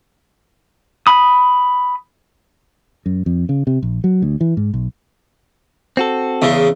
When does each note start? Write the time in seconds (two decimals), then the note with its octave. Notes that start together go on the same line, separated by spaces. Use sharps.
1.07 B5 D#6
3.06 F#2
3.26 F2
3.49 C#3
3.67 C3
3.82 A#1
4.04 F#3
4.22 D2
4.41 E3
4.57 G#2
4.74 B1
5.97 C4 F#4 A4
6.42 E2 C#3